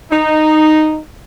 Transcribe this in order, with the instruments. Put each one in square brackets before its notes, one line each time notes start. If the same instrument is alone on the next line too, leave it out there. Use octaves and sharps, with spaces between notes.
[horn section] D#4